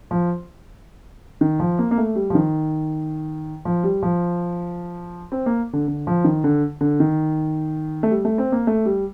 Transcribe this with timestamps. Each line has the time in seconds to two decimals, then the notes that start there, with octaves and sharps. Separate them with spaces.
0.11 F3
1.41 D#3
1.60 F3
1.79 A#3
1.91 A#3
1.98 A3
2.15 G3
2.30 F3
2.35 D#3
3.65 F3
3.84 G3
4.03 F3
5.32 C4
5.46 A#3
5.73 D3
5.88 D3
6.07 F3
6.24 D#3
6.44 D3
6.81 D3
7.00 D#3
8.03 A3
8.11 G3
8.25 A3
8.38 C4
8.52 A#3
8.67 A3
8.86 G3